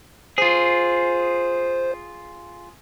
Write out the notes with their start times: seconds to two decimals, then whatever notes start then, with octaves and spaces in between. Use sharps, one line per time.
0.38 F4 G#4 C5